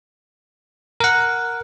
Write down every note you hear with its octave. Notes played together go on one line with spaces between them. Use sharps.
A#4 F#5